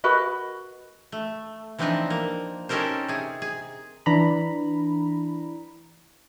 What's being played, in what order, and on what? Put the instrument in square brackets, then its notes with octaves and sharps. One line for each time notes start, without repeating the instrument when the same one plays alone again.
[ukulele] F#4 A#4 B4 D#5
[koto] A3
E3 F3 C4 D4 D#4 F4
A#3
C#4 D#4 G4 A4 A#4 C5
C3 G#4
G#4
[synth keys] E3 D4 A#5 B5